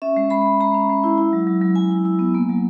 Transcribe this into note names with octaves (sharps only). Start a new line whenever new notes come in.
C#4 E5
G#3
G#3 B5
G#3
G#3 A#5
C#4
G#3
E4
E4
F#3
F#3
F#3
F#3 G#5
E4
E4
B3
A#3
F#3